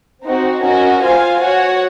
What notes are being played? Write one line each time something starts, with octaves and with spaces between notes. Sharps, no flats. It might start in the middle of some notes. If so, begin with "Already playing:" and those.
C4 D#4 F#4
C#4 F#4 A#4 D#5
F4 C5 F5 G#5
F#4 C#5 F#5